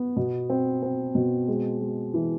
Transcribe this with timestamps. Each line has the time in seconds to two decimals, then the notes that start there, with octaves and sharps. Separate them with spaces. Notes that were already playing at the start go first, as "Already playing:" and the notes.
Already playing: B3
0.16 B2
0.50 C4
0.83 C4
1.15 B2
1.48 G#3
1.81 G#3
2.14 E3